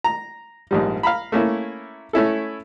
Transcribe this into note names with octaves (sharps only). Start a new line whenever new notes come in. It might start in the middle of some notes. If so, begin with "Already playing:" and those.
A#5
A#1 G#2 G3
F5 A#5 B5
A3 A#3 C#4 E4
A3 C#4 E4 A4